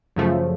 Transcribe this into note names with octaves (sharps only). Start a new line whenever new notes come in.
F#2 C#3 F3 A3